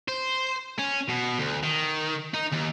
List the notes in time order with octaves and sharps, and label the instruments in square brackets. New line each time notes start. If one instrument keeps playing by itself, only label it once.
[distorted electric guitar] C5
C#4
B2
D2
D#3
D#4
D#2